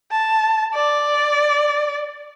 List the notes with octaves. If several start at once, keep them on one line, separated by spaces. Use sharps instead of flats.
A5
D5